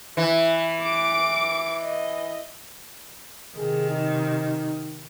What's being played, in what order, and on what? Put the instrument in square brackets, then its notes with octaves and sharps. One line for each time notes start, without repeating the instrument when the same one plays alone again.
[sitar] E3 [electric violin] E5
[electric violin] D6 D7
D#5
[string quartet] C3 D#3 [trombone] G#4
[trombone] D#4